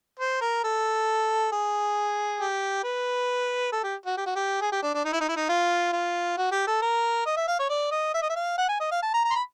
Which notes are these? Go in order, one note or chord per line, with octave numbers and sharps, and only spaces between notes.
C5
A#4
A4
G#4
G4
B4
A4
G4
F#4
G4
F#4
G4
G#4
G4
D4
D4
D#4
E4
D#4
E4
D#4
F4
F4
F#4
G4
A4
A#4
D#5
E5
F5
C#5
D5
D#5
E5
D#5
E5
F5
F#5
G#5
D#5
F5
A5
A#5
A#5
C6
B5